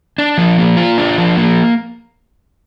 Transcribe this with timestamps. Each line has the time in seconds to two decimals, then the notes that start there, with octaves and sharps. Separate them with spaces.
0.18 D4
0.37 F3
0.58 A#3
0.77 F4
0.98 D4
1.18 F3
1.37 A#3